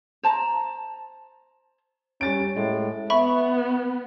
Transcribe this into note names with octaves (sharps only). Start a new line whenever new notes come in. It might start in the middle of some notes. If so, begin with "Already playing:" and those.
C5 A5 A#5
G3 C#4 A6 D7
A2 G#3
B3 E5 B5 C#6